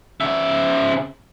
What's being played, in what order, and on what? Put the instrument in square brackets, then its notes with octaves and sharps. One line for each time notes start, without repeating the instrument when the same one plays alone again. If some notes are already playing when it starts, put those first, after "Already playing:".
[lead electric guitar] C#3 E5